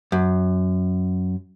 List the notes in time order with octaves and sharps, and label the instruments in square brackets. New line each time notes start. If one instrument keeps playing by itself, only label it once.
[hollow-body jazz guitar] F#2